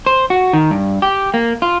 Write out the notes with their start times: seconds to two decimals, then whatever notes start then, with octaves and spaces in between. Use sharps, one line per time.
0.06 C5
0.30 F#4
0.53 D#3
0.71 G2
1.02 G4
1.34 A#3
1.62 F4